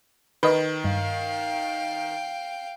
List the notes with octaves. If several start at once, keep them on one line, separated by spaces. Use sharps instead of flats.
D#3 B4 D#5
G2 F5 G5